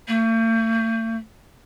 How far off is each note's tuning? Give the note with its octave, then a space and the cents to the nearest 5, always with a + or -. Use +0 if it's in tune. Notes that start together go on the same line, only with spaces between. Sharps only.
A3 +45